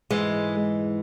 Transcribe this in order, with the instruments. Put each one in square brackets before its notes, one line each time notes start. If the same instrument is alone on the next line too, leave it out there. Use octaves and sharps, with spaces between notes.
[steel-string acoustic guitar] G#2 E3 G#3